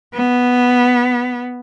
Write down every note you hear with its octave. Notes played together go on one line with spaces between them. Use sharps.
B3